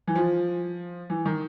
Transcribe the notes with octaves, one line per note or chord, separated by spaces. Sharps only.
E3
F3
E3
D#3